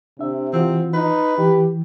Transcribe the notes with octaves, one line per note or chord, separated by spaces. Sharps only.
C3 D4 E5
E3 C4 F4 F#4
D#4 B4
E3 G4